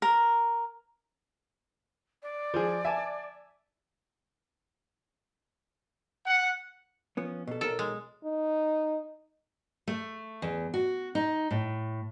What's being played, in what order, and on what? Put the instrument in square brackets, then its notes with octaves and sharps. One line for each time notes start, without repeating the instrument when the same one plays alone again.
[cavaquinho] A#4
[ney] D5
[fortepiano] F3 G#4
E5 G#5 A5
[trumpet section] F#5
[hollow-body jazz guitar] F3 B3 C#4
B2 A4
[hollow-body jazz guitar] B1 A#4 [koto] A4
[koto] G#3
[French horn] D#4
[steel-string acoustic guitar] A3
E2
F#4
D#4
A2